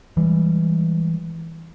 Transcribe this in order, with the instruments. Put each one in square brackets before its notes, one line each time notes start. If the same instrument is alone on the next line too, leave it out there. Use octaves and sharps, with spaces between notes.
[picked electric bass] E3 G3 G#3